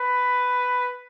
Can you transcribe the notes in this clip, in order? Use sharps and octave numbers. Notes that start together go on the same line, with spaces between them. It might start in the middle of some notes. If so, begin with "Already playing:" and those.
Already playing: B4